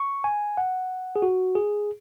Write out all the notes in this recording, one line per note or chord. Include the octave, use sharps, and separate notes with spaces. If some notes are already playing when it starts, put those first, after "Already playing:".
Already playing: C#6
G#5
F#5
G#4
F#4
G#4